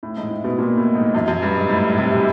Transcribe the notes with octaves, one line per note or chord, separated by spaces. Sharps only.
A2
G#2
A2
B2
A#2
A2
G#2
F#2
F#2
G2
G#2
A2
C3
C3